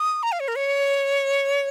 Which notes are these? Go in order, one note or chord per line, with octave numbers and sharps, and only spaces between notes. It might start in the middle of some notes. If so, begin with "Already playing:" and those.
Already playing: D#6
A#5
F5
C#5
A#4
C#5